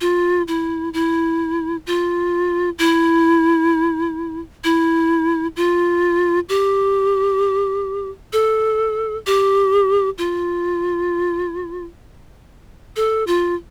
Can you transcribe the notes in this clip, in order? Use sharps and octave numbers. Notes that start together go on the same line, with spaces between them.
F4
E4
E4
F4
E4
E4
F4
G4
A4
G4
F4
A4
F4